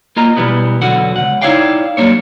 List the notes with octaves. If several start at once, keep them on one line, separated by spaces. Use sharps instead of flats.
A#3 F4 D#5 A#5
B2 E3 G3 B3
B1 E2 D3 F#4 F#5
C#2 C3 F#5
D#4 E4 C#5 D5 F5 G5
F#3 G3 A#3 D4 C#5